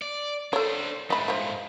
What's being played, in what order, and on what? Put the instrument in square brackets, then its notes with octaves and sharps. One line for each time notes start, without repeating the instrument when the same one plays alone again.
[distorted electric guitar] D5
[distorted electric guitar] D4 C5 [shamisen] A4 C#5
[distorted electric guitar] G#2 A3 [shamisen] D#5 B5
[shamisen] F3 C5